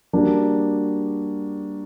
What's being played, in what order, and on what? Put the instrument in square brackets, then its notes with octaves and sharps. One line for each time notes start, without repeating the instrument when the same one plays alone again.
[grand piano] G3 A#3 D4 F#4